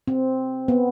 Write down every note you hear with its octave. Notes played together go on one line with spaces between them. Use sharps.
C4
B3